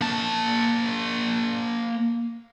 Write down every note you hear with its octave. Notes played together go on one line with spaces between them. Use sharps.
A#3 A5